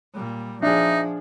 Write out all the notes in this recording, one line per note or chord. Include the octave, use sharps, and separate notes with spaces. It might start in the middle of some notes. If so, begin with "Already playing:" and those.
A#2 G3
F3 D4 D#4 G#4 E5